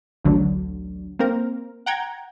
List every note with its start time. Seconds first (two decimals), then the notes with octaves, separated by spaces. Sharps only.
0.24 A1 D2 D3 F#3
1.19 A#3 C4 A#4
1.86 F#5 G5 A#5 G#6